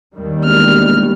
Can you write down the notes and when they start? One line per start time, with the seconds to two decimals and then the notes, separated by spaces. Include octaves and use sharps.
0.14 D#2 D#3 G3
0.44 E1 F6